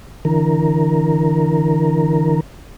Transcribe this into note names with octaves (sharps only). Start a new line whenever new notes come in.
D3 E3 A#4